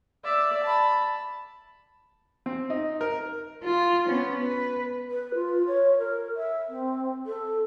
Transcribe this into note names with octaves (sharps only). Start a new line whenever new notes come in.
D5 E5
A5 B5
C4
D#4
A#4
F4
B3 C#4
B4
B4
F4
C#5
A#4
E5
C4
A4